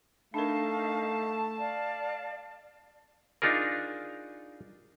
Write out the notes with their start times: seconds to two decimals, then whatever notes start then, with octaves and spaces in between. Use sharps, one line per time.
0.34 A3 D4 D#4 A#4 F5 A5
1.58 D5 F5
3.42 D4 D#4 F4 G#4 A#4